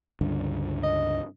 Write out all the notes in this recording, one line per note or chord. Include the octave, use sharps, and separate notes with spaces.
C#2 G2 D3
D#5